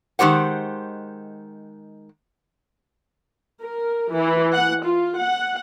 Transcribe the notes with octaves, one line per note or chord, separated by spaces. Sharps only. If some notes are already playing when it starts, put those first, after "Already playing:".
D#3 G#3 G4 C5 F#5
A#4
E3
F#5
F4
F#5